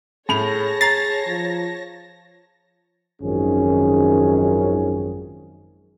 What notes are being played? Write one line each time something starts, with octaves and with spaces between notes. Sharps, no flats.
A2 G#4 C#5 A5 B5 A#6 F7
A#5 A6 C7
F3
G#1 F#2 D#3 F3 C#4 G#4